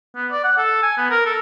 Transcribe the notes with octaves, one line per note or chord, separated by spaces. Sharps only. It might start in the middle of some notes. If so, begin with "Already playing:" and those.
B3
D5
F#5
A4
G#5
B3
A#4
A4